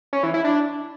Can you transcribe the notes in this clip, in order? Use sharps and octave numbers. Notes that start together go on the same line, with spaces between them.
C#4
E3
E4
D4